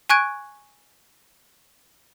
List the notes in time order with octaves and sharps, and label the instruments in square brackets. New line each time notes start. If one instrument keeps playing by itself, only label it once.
[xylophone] G#5 C#6 F#6 G#6 D7